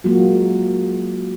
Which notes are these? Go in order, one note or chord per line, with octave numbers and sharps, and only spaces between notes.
F#3 G#3 A#3 F4 F#4